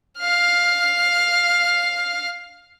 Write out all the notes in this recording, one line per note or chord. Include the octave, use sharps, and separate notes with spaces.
F5 F6